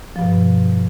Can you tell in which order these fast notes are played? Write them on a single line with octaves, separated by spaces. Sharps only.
F3 G2 B2